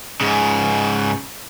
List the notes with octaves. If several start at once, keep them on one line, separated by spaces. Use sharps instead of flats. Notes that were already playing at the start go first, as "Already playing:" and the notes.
G#2 C#3